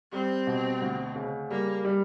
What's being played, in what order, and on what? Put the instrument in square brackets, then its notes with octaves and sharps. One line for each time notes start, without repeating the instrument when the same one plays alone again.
[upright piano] G3 [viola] C4
[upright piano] B2
D2
C#3
[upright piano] G3 [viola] A#3
[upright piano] G3